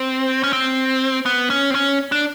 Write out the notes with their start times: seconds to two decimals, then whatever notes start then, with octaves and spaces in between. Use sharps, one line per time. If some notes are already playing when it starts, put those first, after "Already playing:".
Already playing: C4
0.44 C#4
0.53 C4
1.26 B3
1.50 C#4
1.70 C4
1.75 C#4
2.12 D4